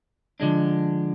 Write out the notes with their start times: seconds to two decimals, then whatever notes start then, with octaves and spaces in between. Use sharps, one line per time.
0.40 D3 F3 G#3 D4